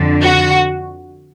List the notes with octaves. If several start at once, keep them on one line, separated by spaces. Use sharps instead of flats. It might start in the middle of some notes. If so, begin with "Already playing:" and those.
Already playing: F2 D3
F#4